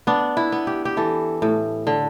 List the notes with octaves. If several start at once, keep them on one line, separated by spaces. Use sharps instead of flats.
B3 D4
E4
B3
G4
G4
E3 A4
A2
D3